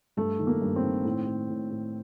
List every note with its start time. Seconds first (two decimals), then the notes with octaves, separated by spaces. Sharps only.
0.17 G2 A3
0.39 D#3
0.47 A#3
0.62 G2
0.76 C4
0.83 D#3
1.05 A2
1.27 A2
1.49 A2
1.71 A2